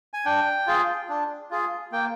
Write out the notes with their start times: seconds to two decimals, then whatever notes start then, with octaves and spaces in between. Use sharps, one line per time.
0.14 G#5
0.25 D4 G5
0.67 F4 G#4
1.09 D4
1.51 F4 G#4
1.92 A#3 G5